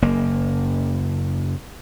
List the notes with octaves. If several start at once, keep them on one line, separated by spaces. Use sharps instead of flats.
F#1 A#3